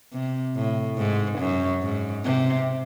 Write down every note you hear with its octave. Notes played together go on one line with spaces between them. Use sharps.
C3
A2
G#2
F#2
G#2
C3